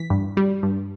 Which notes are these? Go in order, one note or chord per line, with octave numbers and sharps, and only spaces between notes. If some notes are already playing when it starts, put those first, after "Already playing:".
Already playing: E3 B6
G2
G3
G2